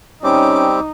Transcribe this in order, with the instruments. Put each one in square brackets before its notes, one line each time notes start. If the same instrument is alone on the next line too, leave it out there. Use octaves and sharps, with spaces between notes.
[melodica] G3 C4 [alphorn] C#4 [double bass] D#4 [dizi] D6